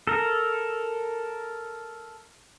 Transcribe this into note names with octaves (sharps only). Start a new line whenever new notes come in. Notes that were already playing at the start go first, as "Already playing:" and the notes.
A4 A#4